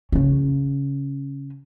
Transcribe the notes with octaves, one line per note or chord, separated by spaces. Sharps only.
C#3 C#4